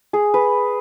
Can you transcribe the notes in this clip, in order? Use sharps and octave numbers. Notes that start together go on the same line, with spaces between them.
G#4
B4